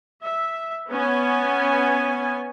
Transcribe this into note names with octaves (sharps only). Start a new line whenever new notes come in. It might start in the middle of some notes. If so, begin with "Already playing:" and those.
E5
B3 C#4 G#5